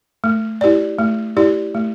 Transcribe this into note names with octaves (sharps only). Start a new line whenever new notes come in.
A3
E4 G4 D5
A3
E4 G4 D5
A3